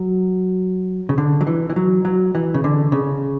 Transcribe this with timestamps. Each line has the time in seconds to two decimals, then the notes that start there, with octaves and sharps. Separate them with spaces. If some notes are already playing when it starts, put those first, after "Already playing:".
Already playing: F#3
1.09 C#3
1.18 D3
1.41 F#3
1.47 E3
1.70 E3
1.76 F#3
2.05 F#3
2.35 E3
2.54 C#3
2.64 D3
2.92 C#3